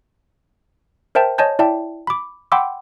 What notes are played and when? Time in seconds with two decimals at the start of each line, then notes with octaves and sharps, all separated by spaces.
1.15 A#4 C5 E5 G5 A5
1.38 C#5 D#5 G#5 A5 G6
1.59 E4 D5 E5 G5 A5
2.07 B5 D6
2.52 F#5 G5 B5 C6 D6 E6